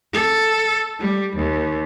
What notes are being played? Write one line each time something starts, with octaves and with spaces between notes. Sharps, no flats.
A4
G3
D#2